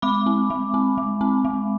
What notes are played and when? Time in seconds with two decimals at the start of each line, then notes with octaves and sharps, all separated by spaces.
0.02 G#3 B5 D6
0.26 C4
0.50 G#3
0.74 C4
0.98 G#3
1.21 C4
1.45 G#3